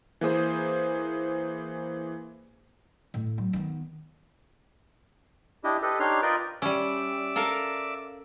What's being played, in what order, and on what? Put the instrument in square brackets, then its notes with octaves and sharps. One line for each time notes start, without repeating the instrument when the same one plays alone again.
[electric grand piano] E3 A#3 G#4 C5
[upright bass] A2
F#3
D#3 B3
[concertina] D4 E4 G4 D#5
G4 A4 B4 D#5
D4 D#4 G4 C#5 C6 F6
F4 A#4 B4 D5 D#5 G5
[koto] G3 C#4 [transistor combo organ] D5 E5
[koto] A4 A#4 F5